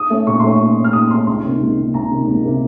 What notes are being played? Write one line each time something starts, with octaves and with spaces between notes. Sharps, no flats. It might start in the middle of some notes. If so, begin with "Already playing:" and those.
Already playing: D#6
A3 C#4
A#2 C#6
A3 C#4 C6
C#6
A#2
A3 C#4
F6
A#2 D#6
A3 C#4 C6
C#2 C6
C3 D#3 A#3
C#2
C3 D#3 A#3
C#2 A#5
C3 D#3 A#3
C#2
C3 D#3 A#3